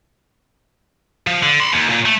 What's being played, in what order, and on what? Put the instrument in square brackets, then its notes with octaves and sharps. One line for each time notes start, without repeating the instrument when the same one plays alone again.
[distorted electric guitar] F3
D3
B5 C6
D#2
A#2
A3